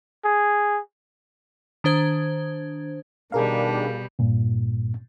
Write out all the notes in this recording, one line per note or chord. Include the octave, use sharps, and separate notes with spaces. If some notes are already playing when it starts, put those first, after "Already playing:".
G#4
D#3 D4 C5 G#6
B2 D#3 G3 D4 G#4 A#4 F5
G2 A#2